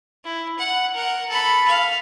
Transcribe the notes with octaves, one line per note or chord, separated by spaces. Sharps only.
E4
F#5
A#4 F#5
A4 B5
F5